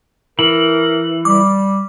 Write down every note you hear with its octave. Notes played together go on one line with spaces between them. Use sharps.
E3 A#4 F#7
G3 D6